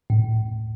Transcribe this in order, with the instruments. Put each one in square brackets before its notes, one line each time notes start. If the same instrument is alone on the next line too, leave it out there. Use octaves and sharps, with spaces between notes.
[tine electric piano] A2